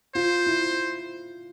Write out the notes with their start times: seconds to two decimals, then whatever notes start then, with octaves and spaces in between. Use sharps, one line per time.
0.15 F4 C5
0.46 E4